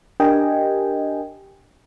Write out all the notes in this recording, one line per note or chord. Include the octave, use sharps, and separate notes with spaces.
D4 G4 A#4 D#5 G5 G#5